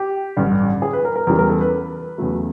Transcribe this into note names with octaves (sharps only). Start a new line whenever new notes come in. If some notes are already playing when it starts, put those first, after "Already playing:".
Already playing: G4
A1 G2 D3
G#4
B4
A#4
A#4
E2 C#3 E3 G3 A#4
A#4
A4
B4
E2 C#3 F#3 A3